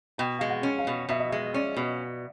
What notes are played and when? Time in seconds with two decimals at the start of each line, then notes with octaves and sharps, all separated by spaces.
0.18 B2 G5
0.39 G#3 F5
0.49 F#5
0.63 C#4
0.78 F5
0.87 B2
1.09 B2 E5
1.19 D#5
1.29 G#3 E5
1.54 C#4 D5
1.77 B2